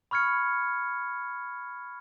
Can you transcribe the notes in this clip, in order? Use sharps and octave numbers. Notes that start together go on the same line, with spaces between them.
B5 C#6 F6 G#6 C#7